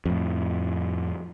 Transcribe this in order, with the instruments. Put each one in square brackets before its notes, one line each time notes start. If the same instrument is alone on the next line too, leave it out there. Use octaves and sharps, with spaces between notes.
[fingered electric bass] F2 A2